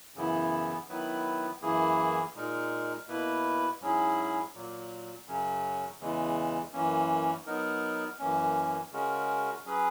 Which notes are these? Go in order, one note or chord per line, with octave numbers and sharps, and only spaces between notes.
F#2 C#3 E3 B3 E4
D#3 F#3 B3 E4 B4
F#2 E3 A#3 E4 G#4
A#2 G#3 D#4 A#4
B2 A#3 E4 B4
G#2 F#3 C#4 E4 G#4
A#2 F#3 A#3
F#2 C#3 F#3 C#4
E2 C#3 E3 G#3
F#2 E3 A#3 C#4
F#3 B3 D#4 A#4
F#2 E3 A#3 C#4
C#3 G#3 C#4 F#4 A#4
F#3 C#4 G#4 B4